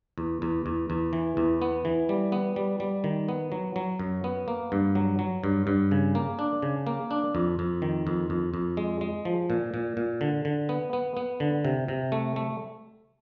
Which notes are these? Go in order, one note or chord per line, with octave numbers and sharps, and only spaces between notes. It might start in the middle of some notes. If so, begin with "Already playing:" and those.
E2
E2
E2
E2
E3
E2
B3
E3
G3
B3
G3
G3
D#3
B3
F#3
F#3
F#2
B3
A#3
G2
F#3
F#3
G2
G2
C#3
A#3
D4
C#3
A#3
D4
F2
F2
D#3
F2
F2
F2
G#3
G#3
F3
A#2
A#2
A#2
D3
D3
B3
B3
B3
D3
C3
C3
A3
A3